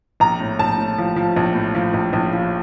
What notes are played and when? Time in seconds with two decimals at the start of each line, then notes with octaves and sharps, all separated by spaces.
0.20 A#1 A#5
0.40 A2
0.59 A#1 A5
0.78 A2
0.98 F3
1.16 F3
1.37 A#1
1.55 A2
1.75 F3
1.94 A#1
2.13 A#1
2.33 F3